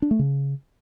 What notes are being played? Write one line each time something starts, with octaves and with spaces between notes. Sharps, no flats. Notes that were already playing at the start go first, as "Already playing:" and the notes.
D4
A3
C#3